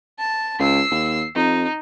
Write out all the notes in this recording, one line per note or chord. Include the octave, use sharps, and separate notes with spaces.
A5
C#2 E6 C7
D#2
F2 D#4